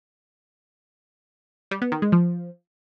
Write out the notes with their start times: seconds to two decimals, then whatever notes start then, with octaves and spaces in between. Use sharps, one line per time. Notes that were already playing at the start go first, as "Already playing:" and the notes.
1.71 G3
1.82 B3
1.92 D#3
2.02 G#3
2.12 F3